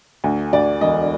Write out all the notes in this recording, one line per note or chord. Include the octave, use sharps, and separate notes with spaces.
D2
D2 D5
E1 D#5